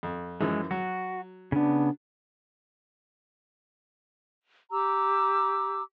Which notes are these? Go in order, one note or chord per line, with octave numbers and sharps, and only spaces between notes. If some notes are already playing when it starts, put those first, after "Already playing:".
F2
F#2 E3 F3 G#3
F#3 F#4
C#3 B3 D4
G4 A#5 D6 E6